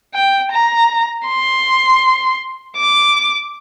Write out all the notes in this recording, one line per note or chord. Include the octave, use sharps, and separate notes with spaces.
G5
A#5
C6
D6